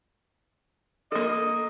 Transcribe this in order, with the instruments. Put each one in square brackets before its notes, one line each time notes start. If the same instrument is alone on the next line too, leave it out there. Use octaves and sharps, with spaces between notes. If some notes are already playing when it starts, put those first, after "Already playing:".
[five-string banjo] A#3 A4 [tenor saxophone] D#5